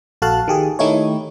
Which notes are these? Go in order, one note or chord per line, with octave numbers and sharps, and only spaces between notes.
A#1 F#4 A4 F5 A5 F#6
D#3 G4 G#4
D#3 A3 D#4 E4 G4 C#5